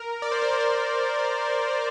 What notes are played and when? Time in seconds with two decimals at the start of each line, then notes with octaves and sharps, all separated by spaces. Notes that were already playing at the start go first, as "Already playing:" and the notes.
Already playing: A#4
0.22 D5
0.32 C5
0.42 A#4
0.53 C5